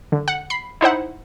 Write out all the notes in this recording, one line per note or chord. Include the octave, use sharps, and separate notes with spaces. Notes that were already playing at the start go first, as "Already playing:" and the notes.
D3
F#5
B5 C7
D#4 E4 C5 F#5